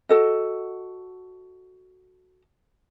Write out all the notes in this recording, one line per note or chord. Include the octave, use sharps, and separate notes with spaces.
F#4 A4 D#5